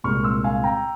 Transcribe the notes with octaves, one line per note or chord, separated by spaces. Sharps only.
C2 A#2 G#3 C#6 F6
C6 E6
F5 G#5
G5 A#5